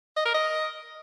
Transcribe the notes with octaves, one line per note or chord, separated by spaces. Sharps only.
D#5
A#4
D#5